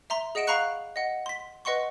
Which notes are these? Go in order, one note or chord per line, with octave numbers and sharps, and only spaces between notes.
E5 A#5 C6
G#4 D#5 F#5 D7 E7
F5 A#5 B5 C#6 F#6 C#7
D#5 F#5
C6 B6
B4 D#5 F#5 C6 C#6